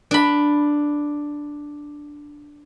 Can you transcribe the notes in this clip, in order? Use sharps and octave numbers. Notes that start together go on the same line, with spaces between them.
D4 B5